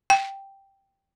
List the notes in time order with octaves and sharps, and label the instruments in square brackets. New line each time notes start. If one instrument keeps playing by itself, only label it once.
[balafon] G5